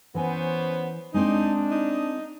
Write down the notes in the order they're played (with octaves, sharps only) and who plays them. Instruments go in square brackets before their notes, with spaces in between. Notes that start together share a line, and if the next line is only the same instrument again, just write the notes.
[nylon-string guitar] E3 G#5 [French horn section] B3 C#4 C5
[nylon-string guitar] G#3 C4 D5 [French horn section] D4 [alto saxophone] D#4
[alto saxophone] D#4